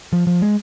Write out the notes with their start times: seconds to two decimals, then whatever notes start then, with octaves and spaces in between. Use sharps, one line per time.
0.13 F3
0.27 F3
0.42 G#3